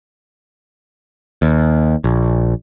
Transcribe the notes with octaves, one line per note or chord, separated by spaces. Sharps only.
D#2
A#1